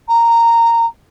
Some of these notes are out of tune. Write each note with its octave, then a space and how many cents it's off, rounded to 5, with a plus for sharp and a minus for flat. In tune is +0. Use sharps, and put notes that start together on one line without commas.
A#5 -10